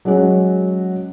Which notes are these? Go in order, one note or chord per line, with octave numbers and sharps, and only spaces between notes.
F#3 G#3 C#4 F#4